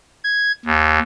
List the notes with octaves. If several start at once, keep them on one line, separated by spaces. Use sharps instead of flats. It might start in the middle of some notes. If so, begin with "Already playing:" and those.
G#6
D#2